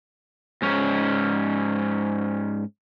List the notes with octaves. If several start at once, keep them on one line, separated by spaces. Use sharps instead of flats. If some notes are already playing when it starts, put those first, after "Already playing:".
G#2 C#4